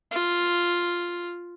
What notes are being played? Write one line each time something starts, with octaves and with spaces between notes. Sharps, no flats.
F4